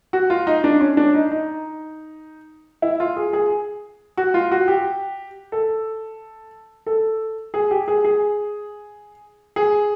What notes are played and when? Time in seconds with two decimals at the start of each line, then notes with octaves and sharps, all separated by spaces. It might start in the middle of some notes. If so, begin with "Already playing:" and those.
0.13 F#4
0.30 F4
0.47 D#4
0.64 D4
0.81 C#4
0.97 D4
1.14 D#4
1.31 D#4
2.82 E4
3.00 F4
3.16 G#4
3.33 G#4
4.17 F#4
4.34 F4
4.52 F#4
4.68 G4
5.52 A4
6.87 A4
7.54 G#4
7.71 G4
7.88 G#4
8.05 G#4
9.56 G#4